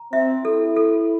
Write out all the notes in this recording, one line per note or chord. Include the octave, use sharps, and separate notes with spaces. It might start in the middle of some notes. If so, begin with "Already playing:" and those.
Already playing: A#5
C4 E5
E4 A4
A4